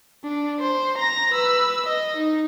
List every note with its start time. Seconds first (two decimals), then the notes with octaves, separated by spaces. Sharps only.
0.24 D4
0.59 C5
0.97 A#5 A#6
1.32 B4 E6
1.86 D#5
2.17 D#4